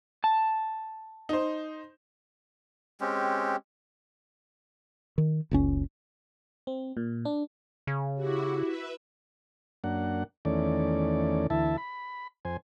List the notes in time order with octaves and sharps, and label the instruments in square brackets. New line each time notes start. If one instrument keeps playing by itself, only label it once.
[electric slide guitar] A5
[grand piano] D#4 C5
[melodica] G#3 C4 C#4 G4
[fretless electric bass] D#3
F#1 C#2 C#4
[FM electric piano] C4
A#2
D4
[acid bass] C#3
[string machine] E4 F#4 [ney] G4
[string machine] B4 E5
[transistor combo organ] F#2 A#3 D4 F#5
E2 D#3 A3 C#4 D5
D2 E3 E4 E5 A5
B5
F2 C5 G#5